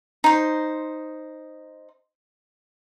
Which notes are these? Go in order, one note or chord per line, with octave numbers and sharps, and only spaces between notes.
D#4 C5